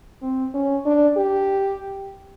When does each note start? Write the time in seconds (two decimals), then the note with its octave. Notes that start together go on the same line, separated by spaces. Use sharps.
0.22 C4
0.54 C#4
0.85 D4
1.17 G4